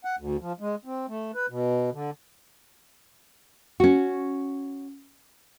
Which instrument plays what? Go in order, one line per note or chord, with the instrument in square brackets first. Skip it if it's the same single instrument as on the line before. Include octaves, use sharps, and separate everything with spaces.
[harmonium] F#5
D2
F3
G#3
C4
A3
B4
B2
D3
[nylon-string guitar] C#4 F#4